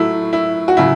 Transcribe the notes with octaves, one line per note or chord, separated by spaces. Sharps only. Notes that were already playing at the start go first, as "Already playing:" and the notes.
Already playing: A2 F#3 A3 E4
E4
F#4
C#3 F#3 E4